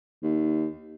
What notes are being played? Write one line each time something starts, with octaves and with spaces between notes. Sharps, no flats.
D#2